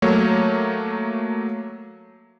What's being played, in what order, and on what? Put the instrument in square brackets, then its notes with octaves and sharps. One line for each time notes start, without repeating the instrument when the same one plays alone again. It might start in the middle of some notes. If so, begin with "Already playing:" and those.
[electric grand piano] F#3 A3 A#3 C#5